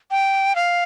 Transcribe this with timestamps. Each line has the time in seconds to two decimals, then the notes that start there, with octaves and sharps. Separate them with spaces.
0.11 G5
0.56 F5